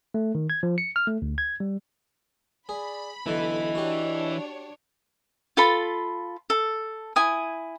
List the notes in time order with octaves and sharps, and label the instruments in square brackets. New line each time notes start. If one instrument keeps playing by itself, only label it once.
[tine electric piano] A3
D#3
G#6
F3
C#7
F6
A3
D2
G#6
G3
[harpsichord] G#4 [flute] D5 [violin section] B5
[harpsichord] B1 D3 [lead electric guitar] E3 E4 [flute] D#5
[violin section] D4 C#5 [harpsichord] F#4 G4
[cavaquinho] F4 A4 B5
A4
E4 G#5 D#6